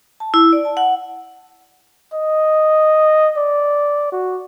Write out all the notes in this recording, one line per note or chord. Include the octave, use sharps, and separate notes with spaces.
A5
E4
D5
A5
F#5
D#5
D5
F#4